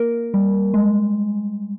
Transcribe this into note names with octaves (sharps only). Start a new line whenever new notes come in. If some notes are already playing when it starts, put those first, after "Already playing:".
Already playing: A#3 A#4
G3
G#3